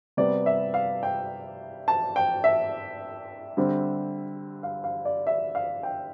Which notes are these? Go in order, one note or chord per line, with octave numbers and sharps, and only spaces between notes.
C3 G3 B3 D5
E5
F5
G5
A5
G5
E5
D3 G3 C4
F5
F5
D5
E5
F5
G5